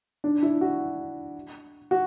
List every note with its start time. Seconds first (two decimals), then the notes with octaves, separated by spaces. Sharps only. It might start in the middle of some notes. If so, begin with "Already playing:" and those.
0.24 D4
0.43 E4
0.61 F#4
1.91 F#4